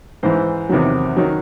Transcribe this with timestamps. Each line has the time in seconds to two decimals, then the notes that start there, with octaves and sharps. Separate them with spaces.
0.23 G#2 E3 C5
0.69 E2 C3 D#3 F#3
1.17 D#3 F#3